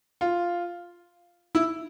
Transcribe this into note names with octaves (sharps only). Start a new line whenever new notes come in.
F4
E4